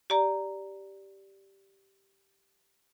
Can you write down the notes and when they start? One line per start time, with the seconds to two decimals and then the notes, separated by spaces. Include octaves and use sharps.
0.10 G4 D5 A#5